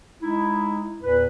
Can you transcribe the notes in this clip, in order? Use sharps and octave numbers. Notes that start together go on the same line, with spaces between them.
G#3 D#4 E4
E2 A#2 B4